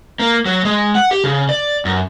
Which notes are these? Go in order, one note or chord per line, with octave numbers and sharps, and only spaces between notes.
A#3
F#3
G#3
F#5
G4
C#3
D5
F#2